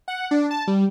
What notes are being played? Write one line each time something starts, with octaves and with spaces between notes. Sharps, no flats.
F#5
D4
A5
G3